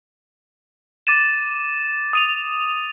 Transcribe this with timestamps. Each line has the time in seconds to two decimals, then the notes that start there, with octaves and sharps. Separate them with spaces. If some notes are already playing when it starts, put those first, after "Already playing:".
1.07 D6 A6 D#7 E7
2.13 D#6 D#7 F7